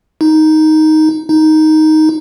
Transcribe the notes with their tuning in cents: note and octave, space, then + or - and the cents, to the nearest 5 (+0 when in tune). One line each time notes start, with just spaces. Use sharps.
D#4 +5
D#4 +5